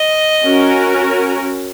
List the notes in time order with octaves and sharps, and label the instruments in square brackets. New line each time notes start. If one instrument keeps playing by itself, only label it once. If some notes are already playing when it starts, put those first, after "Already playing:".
Already playing: [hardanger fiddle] D#5
[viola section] C#4 F#4 A#4